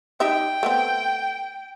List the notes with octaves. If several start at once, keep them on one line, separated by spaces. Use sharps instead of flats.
D#4 G4 E5 G5
A3 B3 C4